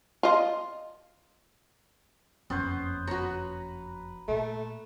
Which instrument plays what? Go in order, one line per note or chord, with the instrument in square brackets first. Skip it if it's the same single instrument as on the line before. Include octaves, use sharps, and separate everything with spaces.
[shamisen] F4 D#5
[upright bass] F#1 F2 [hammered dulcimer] B3 C5 [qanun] C#4
[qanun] F#4 C#5 [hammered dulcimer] B4 A#5
[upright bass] A#2 [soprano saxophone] A3